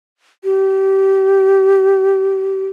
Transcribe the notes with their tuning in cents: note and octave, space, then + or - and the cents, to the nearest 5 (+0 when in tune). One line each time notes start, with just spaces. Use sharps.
G4 -25